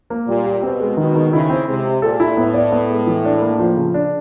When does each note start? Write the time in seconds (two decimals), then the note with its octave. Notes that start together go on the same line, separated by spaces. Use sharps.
0.10 A#3
0.27 A#2 G3
0.46 G4
0.62 B2 C4
0.80 G#3
0.97 B2 D#3
1.16 D#3
1.32 C#3 E4
1.49 C4
1.67 C3 G#3
1.85 G4
2.02 A#2 A4
2.20 E4
2.37 A2 B3
2.54 D5
2.72 B3
2.90 G#3
3.07 E3
3.25 D4
3.41 A#3
3.59 F3
3.77 C#3
3.94 D4